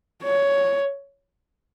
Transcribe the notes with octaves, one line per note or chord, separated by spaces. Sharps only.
C#5